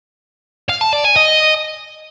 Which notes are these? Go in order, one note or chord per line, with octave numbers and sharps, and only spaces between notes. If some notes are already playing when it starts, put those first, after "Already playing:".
F5
A5
D5
G#5
D#5